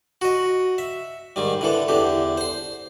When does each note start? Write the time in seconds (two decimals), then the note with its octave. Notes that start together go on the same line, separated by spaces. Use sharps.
0.21 F#4 D#5
0.78 E5
1.36 G#2 D#3 G3
1.61 D3 E3 A4
1.88 E2 D3 G4
2.37 C5 C6